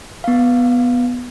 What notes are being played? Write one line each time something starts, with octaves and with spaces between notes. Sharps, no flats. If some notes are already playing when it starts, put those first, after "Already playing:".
B3 F5